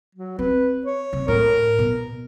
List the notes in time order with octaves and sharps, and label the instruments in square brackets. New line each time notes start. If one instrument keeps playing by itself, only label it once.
[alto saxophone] F#3
[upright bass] C4 [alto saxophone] B4
[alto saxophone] C#5
[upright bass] C3
[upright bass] A2 [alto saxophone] A#4
[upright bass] B2